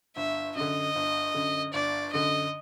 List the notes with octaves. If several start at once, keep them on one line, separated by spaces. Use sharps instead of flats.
G1 E5
F#2 D3 D#5
G1
F#2 D3
G1 D5
F#2 D3 D#5